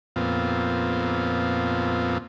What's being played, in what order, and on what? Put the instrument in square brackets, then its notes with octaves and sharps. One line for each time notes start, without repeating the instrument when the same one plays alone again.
[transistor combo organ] F2 A#2 B3 C4 F4